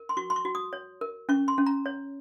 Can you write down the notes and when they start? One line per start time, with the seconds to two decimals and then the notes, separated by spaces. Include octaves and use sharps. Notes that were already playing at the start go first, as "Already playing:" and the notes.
Already playing: A#4
0.09 C6
0.17 F#4 C#6
0.30 C6
0.36 C#6
0.45 F#4
0.55 D#6
0.73 C#5
1.01 A#4
1.29 C#4 C#6
1.48 C6
1.58 C#4
1.66 A#5
1.86 C#5